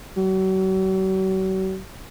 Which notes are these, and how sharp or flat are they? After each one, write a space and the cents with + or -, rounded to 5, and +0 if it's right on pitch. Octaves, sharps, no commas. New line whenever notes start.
F#3 +40